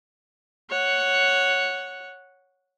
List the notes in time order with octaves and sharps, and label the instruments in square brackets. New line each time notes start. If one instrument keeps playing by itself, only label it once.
[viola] C#5 F#5